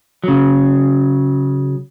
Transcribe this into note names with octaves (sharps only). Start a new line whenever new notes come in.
C#3 F#3